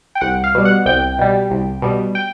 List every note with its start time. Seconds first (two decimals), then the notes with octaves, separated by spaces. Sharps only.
0.15 G5
0.21 C2 F#5
0.44 F5
0.55 B2 G3
0.65 F#5
0.86 C2 G5
1.19 B2 G3
1.50 C2
1.82 B2 G3
2.15 G5